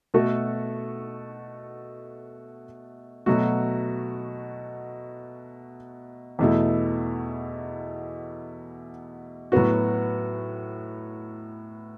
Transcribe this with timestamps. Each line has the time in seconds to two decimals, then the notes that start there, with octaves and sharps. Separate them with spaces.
0.14 B2 A3 F#4 A4
3.26 B2 F#3 A3 F#4
6.39 E2 B2 A3 E4
9.52 A2 F#3 B3 F#4